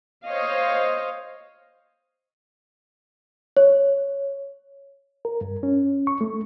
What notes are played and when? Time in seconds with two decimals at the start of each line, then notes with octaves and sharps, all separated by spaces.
0.25 C5 C#5 D#5 F5
3.57 C#5
5.25 A#4
5.41 G2
5.63 C#4
6.07 C#6
6.21 A3